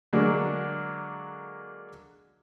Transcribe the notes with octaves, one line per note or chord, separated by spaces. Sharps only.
D3 F#3 G#3 A#3 D4